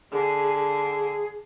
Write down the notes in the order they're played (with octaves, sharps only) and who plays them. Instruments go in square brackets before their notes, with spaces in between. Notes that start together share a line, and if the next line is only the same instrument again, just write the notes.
[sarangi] D3 [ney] G#4
[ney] G#4